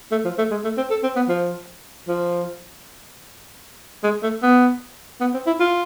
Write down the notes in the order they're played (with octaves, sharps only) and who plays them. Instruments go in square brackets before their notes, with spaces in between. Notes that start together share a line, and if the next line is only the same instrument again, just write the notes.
[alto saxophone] A3
F3
A3
G#3
A3
C4
A4
C4
B3
F3
F3
G#3
A3
B3
B3
C4
E4
F4